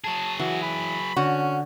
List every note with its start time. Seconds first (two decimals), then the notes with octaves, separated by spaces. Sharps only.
0.04 F#3 G#4 A5
0.39 E3 F#4
0.62 B5
1.16 D3 C#4 F#4